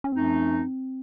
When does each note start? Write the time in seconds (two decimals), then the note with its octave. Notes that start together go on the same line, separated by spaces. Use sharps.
0.04 C#4
0.12 F#2 F3 A3 C4 D#4